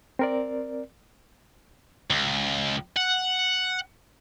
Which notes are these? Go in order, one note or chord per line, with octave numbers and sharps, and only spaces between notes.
C4 A#4 D5
C#2
F#5